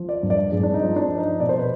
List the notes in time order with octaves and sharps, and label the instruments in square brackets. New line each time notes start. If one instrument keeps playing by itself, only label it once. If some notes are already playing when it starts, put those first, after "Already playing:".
Already playing: [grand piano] F3
D5
G2
D5
G2 G#4
D4
D#4
F3
D4
F3
D#4
B2 D5
C5
B4